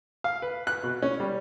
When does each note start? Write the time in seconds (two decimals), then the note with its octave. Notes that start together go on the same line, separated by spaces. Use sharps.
0.24 F5
0.42 B4
0.67 F#6
0.83 B2
1.02 C#4
1.20 G3